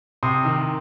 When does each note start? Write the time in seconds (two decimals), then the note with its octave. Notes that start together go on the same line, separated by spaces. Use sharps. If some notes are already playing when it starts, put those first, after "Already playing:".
0.23 C3 C6 D#6
0.45 D#3